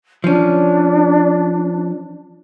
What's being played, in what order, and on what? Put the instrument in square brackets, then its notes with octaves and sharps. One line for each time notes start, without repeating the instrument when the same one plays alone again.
[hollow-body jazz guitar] F3 C#4 [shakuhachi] D4